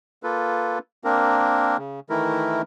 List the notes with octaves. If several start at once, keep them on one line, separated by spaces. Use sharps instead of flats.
A#3 F4 A4 B4
A#3 C4 D4 A#4
C#3
D#3 E3 A3 E4 A#4